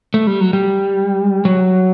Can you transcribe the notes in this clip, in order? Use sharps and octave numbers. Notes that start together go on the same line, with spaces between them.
A3
G3
F#3
G3
F#3